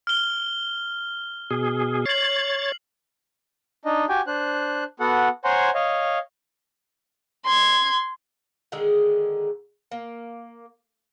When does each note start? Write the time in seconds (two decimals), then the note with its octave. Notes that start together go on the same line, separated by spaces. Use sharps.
0.07 F6 G7
1.51 B2 G#4
2.06 C#5 A6 C7 F#7
3.85 D4 D#4 D#5
4.09 F#4 G4 G5 G#5
4.27 D4 C5 F#6
5.00 B3 F#4 A4 F#5
5.45 C5 C#5 F#5 G#5 A#5 C6
5.75 C#5 D#5 F5
7.45 C6 G#6
8.72 D3 D#3 G#3 G#4
9.91 A#3